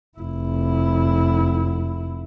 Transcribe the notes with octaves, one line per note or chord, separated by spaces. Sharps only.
F1 E4